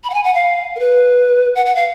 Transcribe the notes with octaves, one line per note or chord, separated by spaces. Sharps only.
B5
F#5
G#5
F#5
F5
A#4
B4
F#5
F#5
F5